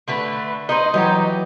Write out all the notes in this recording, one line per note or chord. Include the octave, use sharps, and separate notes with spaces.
D3 A3 B4
D#4 B4 C5 D#5
E3 F#3 D#4 E4 G4